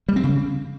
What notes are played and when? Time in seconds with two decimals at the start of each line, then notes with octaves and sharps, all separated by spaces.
0.09 G3
0.16 C4
0.24 C#3